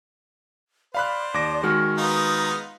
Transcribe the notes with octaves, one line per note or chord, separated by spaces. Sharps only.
C5 D5 F5 B5 F#6
D#2 D6 A#6
D#3 G#3 F#4 F6
B3 D#4 F4 A#5